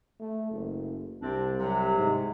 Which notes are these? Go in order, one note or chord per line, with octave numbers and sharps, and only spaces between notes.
A3
F#1
C2 C3 C4 D4
C3 F#3
G#2